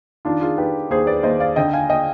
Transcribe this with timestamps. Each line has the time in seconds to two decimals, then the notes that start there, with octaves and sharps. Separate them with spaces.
0.25 D#3 D4 F4
0.41 F4 G#4
0.57 D#3 G4 B4
0.90 D#2 G#4 C5
1.07 B4 D5
1.23 D#2 C5 D#5
1.40 D5 F5
1.56 D3 D#5 G5
1.73 F5 G#5
1.90 D#5 G5